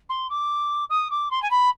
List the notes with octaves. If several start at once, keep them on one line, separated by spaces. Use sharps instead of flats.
C6
D6
D#6
D6
C6
G#5
B5